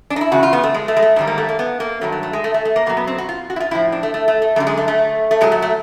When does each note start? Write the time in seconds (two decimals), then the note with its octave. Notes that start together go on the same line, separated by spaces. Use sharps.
0.10 D4
0.16 D#4
0.21 E4
0.32 E2 C#3 F#4
0.43 F4
0.53 B3
0.64 A3
0.74 G#3
0.88 A3
0.97 G#3
1.02 A3
1.16 G#2 D#3 G3 A3
1.27 A#3
1.38 A3
1.49 A#3
1.59 B3
1.80 A#3
2.01 G2 D#3 F#3 A3
2.12 A3
2.23 A3
2.33 G#3
2.44 A3
2.54 A3
2.65 A3
2.76 A#3
2.86 B2 F#3 A#3
2.97 B3
3.07 C4
3.18 F#4
3.29 F4
3.50 F#4
3.56 E4
3.60 F4
3.71 A2 F3 E4
3.92 D4
4.03 A3
4.14 A3
4.28 A3
4.42 A3
4.56 F#2 D3 G3 A3
4.67 G#3
4.77 A3
4.88 A3
5.31 A3
5.41 A#2 F#3 G#3
5.52 A3
5.62 A3